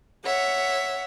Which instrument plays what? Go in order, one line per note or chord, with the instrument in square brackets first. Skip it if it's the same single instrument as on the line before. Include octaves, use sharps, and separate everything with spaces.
[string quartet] C#5 E5 F#5